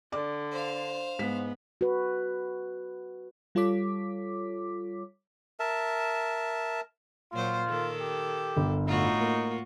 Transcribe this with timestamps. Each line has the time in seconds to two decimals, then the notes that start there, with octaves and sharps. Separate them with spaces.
0.12 D3 D5 D6
0.52 C5 F5
1.19 G#2 G#3 B3 B6
1.81 F#4 B4
3.55 G3 F4 A4 C#5 D6 B6
5.60 A#4 E5 A5
7.33 A#2 F#3 F4 C5
7.67 D#3 A4
8.01 G4
8.57 G1
8.87 A2 D#4 F4 F#4
9.20 A#3